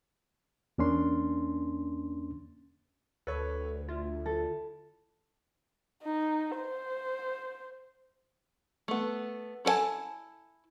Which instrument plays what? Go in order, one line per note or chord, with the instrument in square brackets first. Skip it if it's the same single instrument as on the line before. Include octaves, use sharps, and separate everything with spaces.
[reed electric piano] E2 A#3 C#4 D4 C6
[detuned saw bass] D2 [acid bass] A4 [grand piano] B4 C#5
[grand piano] E4 [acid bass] F4
[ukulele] A4
[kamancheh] D#4
C5
[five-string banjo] A3 B3
E4 A4 C#5 G#5 A5